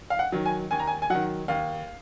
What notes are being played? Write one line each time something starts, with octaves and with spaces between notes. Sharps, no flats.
F5
F#5
D#3 F#3
G#5
D#2 G#5
A#5
G#5
G#5
D#3 F#3 F#5
D#2 F5